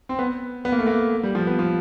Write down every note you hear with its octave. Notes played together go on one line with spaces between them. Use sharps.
C4
B3
B3
A#3
A3
A#3
G3
F3
B3
F3